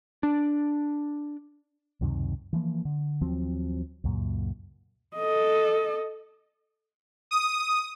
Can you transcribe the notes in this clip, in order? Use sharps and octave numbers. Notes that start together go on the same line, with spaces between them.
D4
C#2 F#2 C3 D#3
E3 F3 A#3
D3
D#2 F3 F#3 C4
C#2 F#2 A#2
A4 D#5
D#6